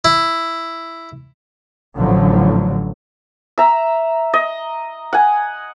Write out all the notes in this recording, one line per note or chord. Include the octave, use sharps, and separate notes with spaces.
E4
A1 D3 F3 F#3
E5 A#5
D#5
F#5 G#5